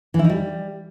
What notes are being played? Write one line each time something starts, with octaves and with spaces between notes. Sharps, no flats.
E3
E4
D#4
G3